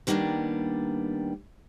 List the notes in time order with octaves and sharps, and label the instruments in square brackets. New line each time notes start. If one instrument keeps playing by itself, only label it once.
[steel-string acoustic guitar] D#3 G3 A#3 B3 D4